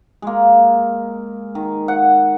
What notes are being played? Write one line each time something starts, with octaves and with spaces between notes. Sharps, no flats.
G#3 A#3
D#3
F#5